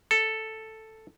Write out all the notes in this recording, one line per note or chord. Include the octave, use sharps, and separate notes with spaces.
A4